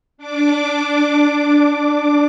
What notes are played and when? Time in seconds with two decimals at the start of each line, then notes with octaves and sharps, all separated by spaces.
0.18 D4 D6